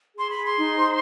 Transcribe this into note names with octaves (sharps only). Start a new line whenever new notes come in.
G#4 C6
B5
G#4
C6
D#4
C5